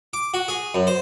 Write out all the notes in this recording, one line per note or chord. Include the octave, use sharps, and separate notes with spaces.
D6
F#4
G#4
F#2
C5